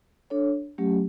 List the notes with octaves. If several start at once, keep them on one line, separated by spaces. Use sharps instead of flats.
D4 A4 C#5
F#3 A3 C#4 G4